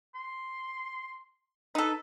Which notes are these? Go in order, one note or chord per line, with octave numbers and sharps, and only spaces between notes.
C6
D#4 A4 B4